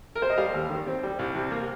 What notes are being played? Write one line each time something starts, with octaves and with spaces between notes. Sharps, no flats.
A#4
C5
D#5
G3 F5
D#2
D#3
C4
G3
C2
C3
A#3